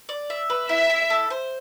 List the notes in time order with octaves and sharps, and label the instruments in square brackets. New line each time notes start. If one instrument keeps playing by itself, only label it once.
[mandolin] D5
E5
B4
[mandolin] E4 [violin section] E5
[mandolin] E4
A4
C5